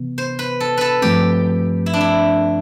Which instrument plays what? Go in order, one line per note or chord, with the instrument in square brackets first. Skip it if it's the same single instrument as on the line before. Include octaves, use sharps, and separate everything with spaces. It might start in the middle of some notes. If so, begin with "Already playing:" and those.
Already playing: [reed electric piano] C3 E3 B3
[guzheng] C5
B4
A4
A4 B4
[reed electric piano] G2 F3 A3 C4 [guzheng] G4
[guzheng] E4
D4
E4